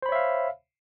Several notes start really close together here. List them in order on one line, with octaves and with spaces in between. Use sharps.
C5 B5 C#5 E5 F5